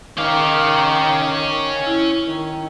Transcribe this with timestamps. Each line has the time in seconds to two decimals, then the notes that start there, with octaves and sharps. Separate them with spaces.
0.18 D#3 C#4 F5 D6
1.86 E4
2.27 D#3